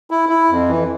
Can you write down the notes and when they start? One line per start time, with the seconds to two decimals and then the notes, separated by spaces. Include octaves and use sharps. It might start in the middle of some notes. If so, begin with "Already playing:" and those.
0.11 E4
0.29 E4
0.50 F2
0.69 E3